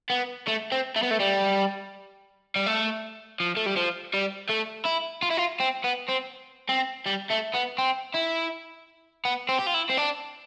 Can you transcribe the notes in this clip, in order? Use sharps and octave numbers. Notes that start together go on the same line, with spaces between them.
B3
A3
C4
A3
B3
A3
G3
G3
A3
F3
A3
G3
F3
G3
A3
E4
F4
E4
F4
C4
B3
C4
C4
G3
A3
B3
C4
E4
B3
C4
G4
F4
E4
C4
D4